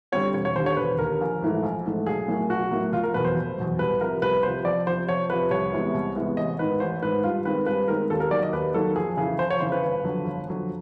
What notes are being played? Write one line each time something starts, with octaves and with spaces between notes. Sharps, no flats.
D3 G3 C4 C#5
E1 C#5
C#5
D#2 D3 C5
C#5
E1 B4
D#2 D3 A#4
A#1
G#2 E3 A3
A#1
G#2 E3 A3
B1 G#4
A2 F#3 A#3
B1 F#4
A2 F#3 A#3
F1 F4
A#4
E2 B2 F#3 B4
C5
F1
E2 B2 F#3
C2 B4
C3 F3 A#4
C2 B4
C3 F3 C5
F2 D5
C3 F3 C5
F2 C#5
C3 F3 B4
C2 C#5
C3 E3 G#3 B3
C2
C3 E3 G#3 B3
A1 D#5
G#2 D#3 B4
A1 C5
G#2 D#3 B4
G2 F4
D#3 G#3 C4 B4
G2 B4
D#3 G#3 C4 A#4
D#2 A4
A#4
D#3 F#3 A#3 D5
D#5
D#2 B4
D#3 F#3 A#3 A4
F2 G#4
C#3 E3 G#4
F2 C5
C#5
C#3 E3 C5
B4
G1
F2 D3 F#3
G1
F2 D3 F#3